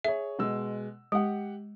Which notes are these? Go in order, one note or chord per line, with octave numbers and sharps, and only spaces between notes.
G#4 C#5 E5
B2 G#3 E6
G#3 G4 F#5